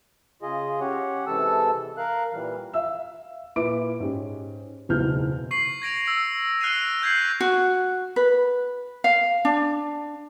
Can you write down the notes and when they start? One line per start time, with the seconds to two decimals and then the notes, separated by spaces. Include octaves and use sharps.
0.42 C#3 F4 G#4 D#5
0.81 C#4 G4 C#5 F#5
1.27 C3 E3 G#3 A4 A5 E6
1.97 A#4 F5 F#6
2.33 A#2 E3 G3
2.74 E5 F5 E6
3.56 A#2 E4 B4 D6 D7
4.00 G#2 C#4 G4
4.89 F#1 B1 E2 G#3 F6 G6
5.51 C#6 C7 F#7
5.82 G#6 A#6 D7 F7
6.07 E6
6.61 F6 F#6 A#6 C7 D#7 F7
7.02 F6 G6 G#6 B6 C7 F#7
7.41 F#4
8.16 B4
9.04 F5
9.45 D4